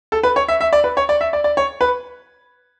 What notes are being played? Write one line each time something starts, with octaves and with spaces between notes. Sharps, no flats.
A4
B4
C#5
E5
E5
D5
B4
C#5
D5
E5
D5
D5
C#5
B4